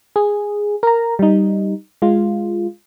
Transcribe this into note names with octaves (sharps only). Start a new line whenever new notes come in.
G#4
A#4 A#5
G3 D#4
G#3 F4